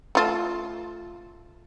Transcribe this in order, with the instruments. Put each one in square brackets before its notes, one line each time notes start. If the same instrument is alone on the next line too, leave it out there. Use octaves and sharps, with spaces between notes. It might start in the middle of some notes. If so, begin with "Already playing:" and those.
[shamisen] A3 F4 A4